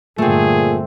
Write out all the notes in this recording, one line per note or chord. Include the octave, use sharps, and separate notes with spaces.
G2 A#2 D3 A3 C4 G#4